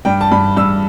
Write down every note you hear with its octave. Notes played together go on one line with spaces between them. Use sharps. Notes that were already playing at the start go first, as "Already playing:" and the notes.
G2 G5
A5
G2 B5
G2 E6